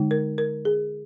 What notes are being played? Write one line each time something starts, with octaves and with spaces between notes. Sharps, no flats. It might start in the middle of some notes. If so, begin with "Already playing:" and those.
Already playing: D3 G#3 D#4
A#4
A#4
G#4